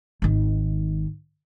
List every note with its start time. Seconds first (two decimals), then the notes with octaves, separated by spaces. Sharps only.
0.22 G#1 D#3